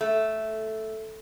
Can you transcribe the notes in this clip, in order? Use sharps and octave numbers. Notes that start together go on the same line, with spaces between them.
A3